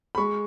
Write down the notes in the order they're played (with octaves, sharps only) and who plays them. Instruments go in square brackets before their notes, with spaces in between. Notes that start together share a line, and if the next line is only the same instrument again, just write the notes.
[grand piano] B5
G#3 C#6